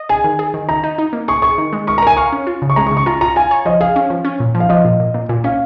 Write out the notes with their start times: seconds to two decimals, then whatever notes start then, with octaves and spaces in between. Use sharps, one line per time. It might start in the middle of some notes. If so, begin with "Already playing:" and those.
Already playing: D#5
0.09 G#4 G#5
0.24 D#3
0.39 G#4
0.54 D#3
0.69 D#4 A#5
0.83 D#4
0.98 D#4
1.13 A#3
1.28 G#4 C#6
1.42 G#4 C#6
1.58 D#3
1.73 G#3
1.87 A#4 C#6
1.98 A#5
2.02 A#4 G#5
2.17 F5 C#6
2.32 C#4
2.47 F4
2.62 C#3
2.70 C#6
2.76 G#3 A#5
2.86 C#6
2.91 C#3
2.97 C#6
3.06 F4 A#5
3.21 F4 A#5
3.36 F4 G#5
3.51 C#5
3.66 F3 D#5
3.81 G#4 F5
3.96 C#4
4.10 F3
4.25 C#4
4.40 A#2
4.55 F3
4.60 F5
4.69 F3 D#5
4.85 A#2
5.00 A#2
5.14 A#2
5.29 A#2
5.44 C#4 F5